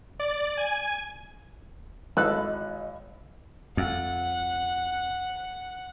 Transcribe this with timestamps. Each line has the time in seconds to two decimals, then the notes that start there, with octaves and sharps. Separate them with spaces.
0.20 D5
0.57 G#5
2.17 G#1 E3 A4 D#5 F5 B5 F#6
3.77 F2 F#5